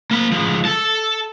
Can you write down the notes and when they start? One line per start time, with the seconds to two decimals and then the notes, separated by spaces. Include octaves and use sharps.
0.11 A#3 B5
0.32 F3 G#3
0.65 A4 A5